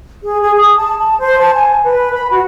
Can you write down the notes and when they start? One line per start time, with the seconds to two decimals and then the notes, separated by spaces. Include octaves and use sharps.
0.23 G#4
0.41 G#4
0.56 D#6
0.76 A5
0.98 A5
1.18 C5
1.39 A5
1.55 G#5
1.84 B4
2.13 B5
2.30 F#4